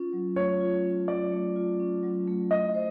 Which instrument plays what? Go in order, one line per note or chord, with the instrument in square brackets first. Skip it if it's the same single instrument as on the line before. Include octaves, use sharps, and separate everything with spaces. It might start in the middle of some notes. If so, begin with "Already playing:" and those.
Already playing: [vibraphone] C#4 F4
F#3
[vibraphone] A3 [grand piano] C#5
[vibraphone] F4
C#4
[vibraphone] F#3 [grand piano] D5
[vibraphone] A3
F4
C#4
F#3
A3
[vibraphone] E4 [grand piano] D#5
[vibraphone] C5